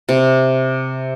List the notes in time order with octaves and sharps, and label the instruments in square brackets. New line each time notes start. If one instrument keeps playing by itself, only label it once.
[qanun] C3